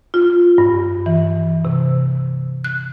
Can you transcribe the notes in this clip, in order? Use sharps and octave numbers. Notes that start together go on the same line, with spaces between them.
F4
G2
E3
C3
F#6